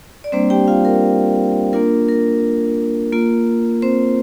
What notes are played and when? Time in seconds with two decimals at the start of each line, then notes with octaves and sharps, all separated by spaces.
0.24 D5
0.32 G3 A#3 C4 D4 C5
0.50 G4 G5
0.68 F4 F5
0.85 A#4
1.73 A#3 D4 F4 A#4
2.08 A#4
3.12 A#3 F4
3.82 C4 C5